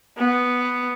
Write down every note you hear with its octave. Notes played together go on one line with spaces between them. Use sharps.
B3